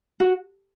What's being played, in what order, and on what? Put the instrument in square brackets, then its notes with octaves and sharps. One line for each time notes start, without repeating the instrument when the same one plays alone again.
[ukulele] F#4